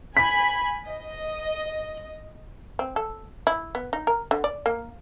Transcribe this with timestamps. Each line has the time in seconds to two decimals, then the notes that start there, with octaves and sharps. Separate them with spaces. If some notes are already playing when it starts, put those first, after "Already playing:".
0.17 G#5 B5 B6
0.88 D#5
2.79 C4
2.96 A4
3.47 E4
3.75 B3
3.93 D#4
4.07 A#4
4.31 D3
4.44 D5
4.66 A#3